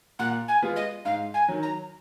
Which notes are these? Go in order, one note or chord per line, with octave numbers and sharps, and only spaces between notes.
A#2 F#5
G#5
G#3 B3 F4
D#5
G#2 F5
G#5
D#3 F#3
A#5